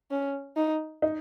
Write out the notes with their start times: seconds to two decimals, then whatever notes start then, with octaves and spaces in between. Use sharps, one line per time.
0.11 C#4
0.57 D#4
1.02 D#4